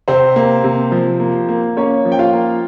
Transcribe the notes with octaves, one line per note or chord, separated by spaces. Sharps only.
C3 C4 C5
A#3
C3
F3
A#3
A#3
A#3 C#4 C#5
F3
G5
F4 F5
A#3